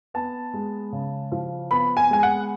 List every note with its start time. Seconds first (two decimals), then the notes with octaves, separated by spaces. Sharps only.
0.14 B3 A5
0.54 G#3
0.92 C#3
1.32 F3
1.71 B3 B5
1.97 G#5
2.10 G#3 G#5
2.23 F#5